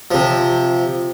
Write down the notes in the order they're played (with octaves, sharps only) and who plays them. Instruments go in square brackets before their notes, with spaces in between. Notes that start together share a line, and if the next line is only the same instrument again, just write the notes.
[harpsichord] C3 F3